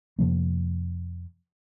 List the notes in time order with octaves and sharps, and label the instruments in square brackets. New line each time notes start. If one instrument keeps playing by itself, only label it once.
[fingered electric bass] F2 C3 F3 A#3